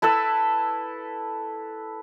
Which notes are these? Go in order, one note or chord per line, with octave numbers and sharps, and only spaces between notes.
E4 A4 B4 E6